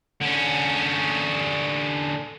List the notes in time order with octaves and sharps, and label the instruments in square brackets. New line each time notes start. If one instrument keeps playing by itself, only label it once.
[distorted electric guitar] D3 C#4